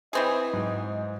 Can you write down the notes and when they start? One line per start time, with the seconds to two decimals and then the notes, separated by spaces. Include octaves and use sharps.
0.13 E3 C4 G#4 D#5
0.53 G#2 F#3